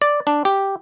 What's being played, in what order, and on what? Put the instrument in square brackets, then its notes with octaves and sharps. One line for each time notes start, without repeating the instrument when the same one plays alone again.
[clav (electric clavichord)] D5
D4
G4